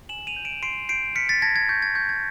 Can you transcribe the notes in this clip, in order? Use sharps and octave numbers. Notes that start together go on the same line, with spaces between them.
G#5 E7 F#7
D#7 F7
G6
D7 E7
C6 C7 D7
G6 C7 D7
F6 B6 C#7
A6 B6
A5 G#6 A#6
G#6
C#6 G6
G#6
C#6 G6
G#6